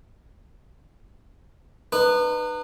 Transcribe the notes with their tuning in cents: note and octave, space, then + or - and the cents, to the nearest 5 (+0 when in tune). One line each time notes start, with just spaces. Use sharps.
D#4 -40 B4 +0